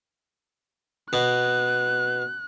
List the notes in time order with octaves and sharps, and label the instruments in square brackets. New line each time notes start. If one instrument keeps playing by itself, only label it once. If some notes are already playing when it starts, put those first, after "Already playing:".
[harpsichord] B2 [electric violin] F#6